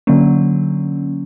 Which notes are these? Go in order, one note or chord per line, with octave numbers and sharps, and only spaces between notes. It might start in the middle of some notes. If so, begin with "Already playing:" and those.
D3 F#3 A#3 C#4